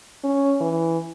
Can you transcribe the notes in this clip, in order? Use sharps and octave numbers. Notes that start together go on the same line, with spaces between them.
C#4
E3